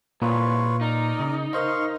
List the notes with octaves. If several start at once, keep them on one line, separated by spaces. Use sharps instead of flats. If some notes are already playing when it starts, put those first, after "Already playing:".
C2 A#2 F4 B4 C#5
D#4 A#4 D5
C#3
A#4 C5 D#5 F5 C6 C#6